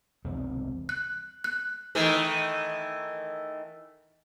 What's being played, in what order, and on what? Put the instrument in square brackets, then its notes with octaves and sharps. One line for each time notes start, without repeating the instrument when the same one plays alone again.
[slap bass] E1 C2 D#3 C4
[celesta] F#6
F#6
[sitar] D#3 E3 A3